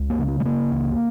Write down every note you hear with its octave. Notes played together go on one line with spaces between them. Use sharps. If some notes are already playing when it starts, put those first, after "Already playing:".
Already playing: C#2
A#3
C#3
C#4
G#3
C#3 A#3
C#2